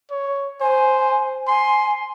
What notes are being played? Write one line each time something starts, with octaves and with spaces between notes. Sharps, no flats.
C#5
C5 G#5
G#5 C6